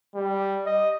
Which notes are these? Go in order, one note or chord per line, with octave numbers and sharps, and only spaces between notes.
G3
D#5